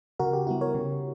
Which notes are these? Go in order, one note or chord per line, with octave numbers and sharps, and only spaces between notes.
C#3 F#4 A#4
G4
G3 B3 E4 F#4
A#4 C#5
C#3